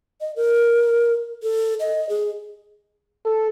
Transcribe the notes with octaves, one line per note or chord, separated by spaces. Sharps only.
D#5
A#4
A4
D#5
G#4
A4